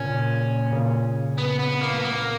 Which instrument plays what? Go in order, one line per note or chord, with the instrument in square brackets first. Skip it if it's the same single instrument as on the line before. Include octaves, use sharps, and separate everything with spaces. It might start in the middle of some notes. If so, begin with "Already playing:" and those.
Already playing: [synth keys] A#2 C#3 [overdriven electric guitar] C#4
[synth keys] A#2 C#3
[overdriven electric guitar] B3
B3
A#3
B3
A#3